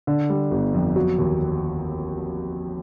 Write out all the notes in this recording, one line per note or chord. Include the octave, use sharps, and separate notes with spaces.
D3
G3
G1
F2
F#3
D#2